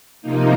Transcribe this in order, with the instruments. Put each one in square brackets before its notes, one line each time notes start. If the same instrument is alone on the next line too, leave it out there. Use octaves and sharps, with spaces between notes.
[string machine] C3 F3 A#3 D#4